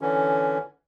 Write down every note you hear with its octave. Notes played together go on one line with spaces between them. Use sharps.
D3 E3 C#4